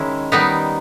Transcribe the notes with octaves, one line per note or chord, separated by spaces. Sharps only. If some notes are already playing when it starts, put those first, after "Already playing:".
Already playing: D#3 G#3 C#4 E4
D#3 G3 B3 D#4